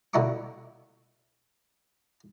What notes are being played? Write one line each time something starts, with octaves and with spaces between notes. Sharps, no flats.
B2 D3 A#3 E4 C#6 D6